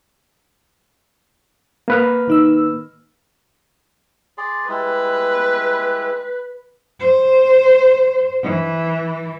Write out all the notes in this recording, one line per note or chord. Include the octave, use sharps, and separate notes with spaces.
A#3 B4 F6
D#3 D#4 E6
G#4 D5 C6
G3 G#3 E4 B4
C5
E3